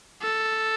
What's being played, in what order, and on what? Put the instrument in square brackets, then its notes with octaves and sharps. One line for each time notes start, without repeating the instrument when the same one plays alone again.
[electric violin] A4